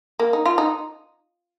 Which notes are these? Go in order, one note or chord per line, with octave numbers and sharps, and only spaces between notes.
A#3
D#4
F4
D#4